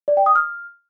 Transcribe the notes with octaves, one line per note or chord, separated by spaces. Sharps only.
D5
G5
D#6
F6